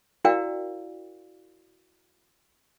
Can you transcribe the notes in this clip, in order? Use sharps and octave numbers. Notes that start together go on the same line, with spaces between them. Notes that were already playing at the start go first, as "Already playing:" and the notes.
E4 F#4 A#4 D5 F5 G5